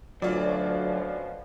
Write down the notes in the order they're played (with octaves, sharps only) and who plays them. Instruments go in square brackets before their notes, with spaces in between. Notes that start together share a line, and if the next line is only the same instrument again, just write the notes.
[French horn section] D2 [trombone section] B2 F3 C#4 [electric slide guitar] F#3 [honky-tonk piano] F4 D5